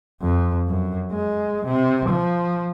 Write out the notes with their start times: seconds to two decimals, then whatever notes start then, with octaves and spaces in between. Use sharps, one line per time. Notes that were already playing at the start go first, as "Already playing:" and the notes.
0.22 F2
0.68 F#2
1.12 G#3
1.66 C3
2.09 F3